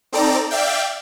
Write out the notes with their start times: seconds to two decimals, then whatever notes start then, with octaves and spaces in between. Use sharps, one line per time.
0.12 C4 D#4 A4 D5 A#5
0.51 D5 E5 F5 G5